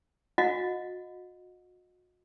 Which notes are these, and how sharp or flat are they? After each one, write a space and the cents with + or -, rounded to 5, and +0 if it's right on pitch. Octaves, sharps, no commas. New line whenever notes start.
F#4 -35 D#5 +0 F#5 -35